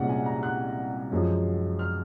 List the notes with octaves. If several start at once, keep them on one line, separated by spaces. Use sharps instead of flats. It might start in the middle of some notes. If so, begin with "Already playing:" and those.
Already playing: C2 A#2 G#3 C#4 F#5
G#5
A#5
F#6
F#2 F3 G#3
F6